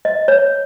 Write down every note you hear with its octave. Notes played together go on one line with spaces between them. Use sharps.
D#5
C#5